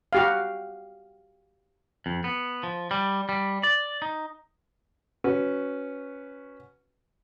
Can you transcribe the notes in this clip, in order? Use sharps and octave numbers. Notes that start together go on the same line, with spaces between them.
F#4 G4 F5
F2
B3
F3
G3
G3
D5
D#4
C#4 F#4 B4